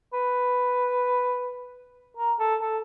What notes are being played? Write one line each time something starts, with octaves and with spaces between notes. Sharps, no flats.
B4
A#4
A4
A4